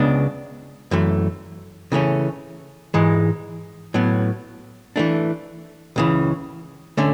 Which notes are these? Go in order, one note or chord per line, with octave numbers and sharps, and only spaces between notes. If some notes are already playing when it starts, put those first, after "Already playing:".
Already playing: C#2 C#3 G#3 B3 D4
F#2 E3 A3
C#3 E3 A3 C#4
G#2 E3 G#3
A2 F#3 B3
E3 A3 D4
C#2 C#3 E3
D3 A3 C#4